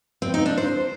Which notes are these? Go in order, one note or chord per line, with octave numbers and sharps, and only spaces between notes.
C4
D#4
D4
C5